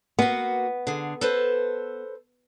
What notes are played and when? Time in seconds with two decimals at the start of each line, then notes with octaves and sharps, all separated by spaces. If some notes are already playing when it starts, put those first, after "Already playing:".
0.19 A#3 B3 F#4
0.87 D3 G#4
1.21 A4 B4 C5